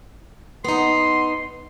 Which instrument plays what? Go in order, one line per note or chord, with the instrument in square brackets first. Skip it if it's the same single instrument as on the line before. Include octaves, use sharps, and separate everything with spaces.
[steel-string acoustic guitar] B3 D#4 [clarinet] C6